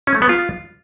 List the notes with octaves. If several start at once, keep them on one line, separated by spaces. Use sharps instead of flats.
C#4
A3
B3
F4